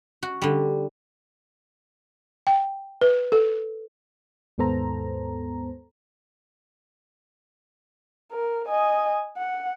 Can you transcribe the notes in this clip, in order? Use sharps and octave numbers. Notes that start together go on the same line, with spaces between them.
F#4
D3 G3
G5
B4
A4
D#2 G#2 B3 A4 C5 A#5
A#4
D#5 G#5
F#5